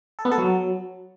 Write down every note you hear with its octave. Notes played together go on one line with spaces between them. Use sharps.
A4
B3
A4
F#3